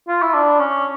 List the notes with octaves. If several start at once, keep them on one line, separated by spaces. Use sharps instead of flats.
F4
E4
D4
C#4